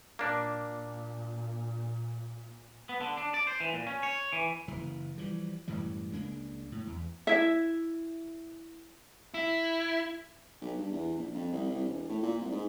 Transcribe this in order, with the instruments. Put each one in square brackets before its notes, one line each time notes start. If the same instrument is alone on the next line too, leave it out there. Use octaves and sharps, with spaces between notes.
[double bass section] A#2 [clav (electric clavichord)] A#3 D4
[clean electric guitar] B3
D3
D4
D5
C5
E3
A#2
C#4
C#5
E3
[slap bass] F#1 E3
E3 F3 G3
F#2 A2 E3 G3
C#2 G#3 A#3 D4
A2
E2
[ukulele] E4 E5
[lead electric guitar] E4
[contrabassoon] B1
G2
E2
A#1
F2
C2
C2
E1
A2
A#2
C2
G#2